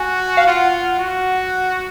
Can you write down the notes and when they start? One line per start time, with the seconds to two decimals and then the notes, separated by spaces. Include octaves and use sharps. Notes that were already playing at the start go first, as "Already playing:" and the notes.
Already playing: F#4 G#5
0.37 F5
0.47 F4 F#5
0.99 F#4